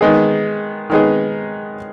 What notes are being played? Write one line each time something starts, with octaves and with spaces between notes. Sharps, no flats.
D#3 G#3 B3 D#4 G#4
D#3 G#3 B3 D#4 G#4